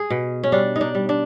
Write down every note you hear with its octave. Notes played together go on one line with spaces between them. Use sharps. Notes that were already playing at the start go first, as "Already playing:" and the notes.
Already playing: G#4
B2
C#4
G3 D4
D#4
D4
G3
D4